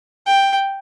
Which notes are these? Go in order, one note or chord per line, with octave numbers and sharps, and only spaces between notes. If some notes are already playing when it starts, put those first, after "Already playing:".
G5